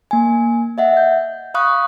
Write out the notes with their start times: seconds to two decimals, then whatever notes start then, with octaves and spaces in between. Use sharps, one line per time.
0.11 A#3 G#5
0.78 D#5 E5 F#5
0.97 G6
1.54 F5 B5 C#6 D#6 F#6